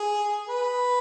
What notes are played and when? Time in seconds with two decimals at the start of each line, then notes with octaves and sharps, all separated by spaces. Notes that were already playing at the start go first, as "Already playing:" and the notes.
Already playing: G#4
0.49 B4